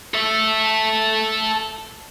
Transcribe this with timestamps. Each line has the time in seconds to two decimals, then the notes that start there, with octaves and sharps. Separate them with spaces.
0.14 A4 E5